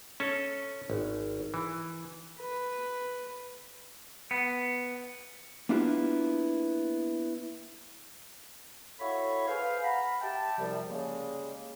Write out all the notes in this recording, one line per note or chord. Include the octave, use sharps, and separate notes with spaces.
C#4 A4
G#1
E3
B4
B3
A#3 B3 D4 E4 F4 G4
E4 F#4 A4 C#5 F5 B5
G#4 B4 C5 F5
F5 F#5 A#5 B5
G4 E5 G5 A5
C2 F#2 C3 F3 G3
C#3 G3 G#3 A#3 C#4 G#4